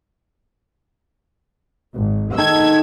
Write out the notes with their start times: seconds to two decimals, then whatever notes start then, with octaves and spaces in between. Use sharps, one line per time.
1.95 G#1
2.38 D#3 D#4 A4 E6 G#6